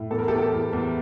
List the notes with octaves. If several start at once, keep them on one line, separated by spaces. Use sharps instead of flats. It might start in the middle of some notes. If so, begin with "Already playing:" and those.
Already playing: A2
E2 A4
A#4
G4 A4
E2
G4 A4
E2
E2